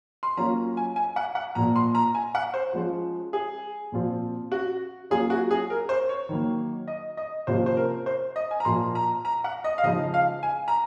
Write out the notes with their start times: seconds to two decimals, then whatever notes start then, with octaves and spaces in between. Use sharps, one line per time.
0.23 C6
0.37 F#3 A#3 C#4 F4 A#5
0.77 G#5
0.96 G#5
1.16 F#5
1.35 F#5
1.55 A#2 F3 A#3 A#5
1.76 C6
1.95 A#5
2.15 G#5
2.35 F#5
2.54 C5
2.73 F3 G#3 C#4 F4
3.33 G#4
3.92 A#2 F3 C4 F4
4.52 F#4
5.10 F#3 A#3 C#4 F4 G#4
5.30 F#4
5.51 G#4
5.70 A#4
5.89 C5
6.09 C#5
6.29 D#3 F#3 A#3
6.88 D#5
7.17 D#5
7.47 C3 F3 A#3 C#4 F4 C5
7.66 C5
7.77 A#4
8.06 C5
8.36 D#5
8.51 G#5
8.60 A#5
8.65 A#2 F3 A#3 F4 C6
8.95 A#5
9.25 A#5
9.44 F#5
9.64 D#5
9.78 F5
9.83 C#3 F3 G#3 D#4 D#5
10.14 F5
10.43 G#5
10.68 A#5